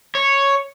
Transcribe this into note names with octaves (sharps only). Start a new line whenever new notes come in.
C#5